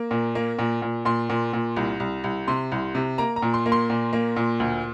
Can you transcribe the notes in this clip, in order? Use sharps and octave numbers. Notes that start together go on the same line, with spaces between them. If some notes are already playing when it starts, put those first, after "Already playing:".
Already playing: A#3
A#2
A#3
A#2
A#2
A#2 C6
A#2
A#2
C2
C2
C2
C3 C6
C2
C3
A#3 A#5
A#5
A#2
C6
A#3
C6
A#2
A#3
A#2
D2